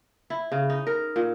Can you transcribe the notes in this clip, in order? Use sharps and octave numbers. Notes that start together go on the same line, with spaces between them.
E4
C#3
D#4
A#4
A#2